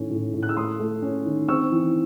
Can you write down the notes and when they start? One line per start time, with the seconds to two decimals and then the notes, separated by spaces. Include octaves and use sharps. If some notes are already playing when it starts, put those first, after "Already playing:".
Already playing: A2 D#3 C#4
0.10 A2
0.34 A2
0.43 F#6
0.49 E6
0.57 A3 C6 D#6
0.80 A3
1.02 C#4
1.26 D#3
1.48 C4 C#6 E6
1.71 E3